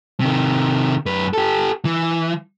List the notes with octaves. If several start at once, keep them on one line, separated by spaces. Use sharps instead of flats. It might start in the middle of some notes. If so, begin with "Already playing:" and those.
C3 D#3
F#2 B4
G4 A4
E3